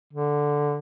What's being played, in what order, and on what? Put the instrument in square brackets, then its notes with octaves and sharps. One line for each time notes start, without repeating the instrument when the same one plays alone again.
[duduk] D3